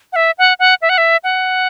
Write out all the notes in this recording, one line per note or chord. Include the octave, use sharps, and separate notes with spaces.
F#5
E5
F#5
F#5
E5
F#5
E5
F#5